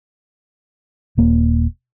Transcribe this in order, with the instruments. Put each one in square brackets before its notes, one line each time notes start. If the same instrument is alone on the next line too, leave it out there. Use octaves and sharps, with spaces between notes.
[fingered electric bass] D#1 A#3